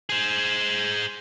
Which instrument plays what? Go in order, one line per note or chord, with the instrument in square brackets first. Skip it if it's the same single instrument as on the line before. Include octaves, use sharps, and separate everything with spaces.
[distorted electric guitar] G#4 C5